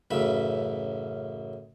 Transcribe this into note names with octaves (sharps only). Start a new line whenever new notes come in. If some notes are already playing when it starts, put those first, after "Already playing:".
A1 F#2 C#3 E5 B5